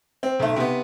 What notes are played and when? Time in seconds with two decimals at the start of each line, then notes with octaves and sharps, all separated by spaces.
0.23 C4
0.39 B1 A3
0.56 C3 B3